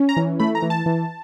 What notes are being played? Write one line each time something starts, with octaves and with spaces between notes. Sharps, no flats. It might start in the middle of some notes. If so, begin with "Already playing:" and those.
Already playing: C#4
A#5
E3
A3 B5
A#5
E3
A5
E3